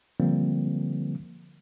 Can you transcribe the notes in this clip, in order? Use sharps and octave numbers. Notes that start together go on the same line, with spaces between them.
D3 F3 G3 A#3 C4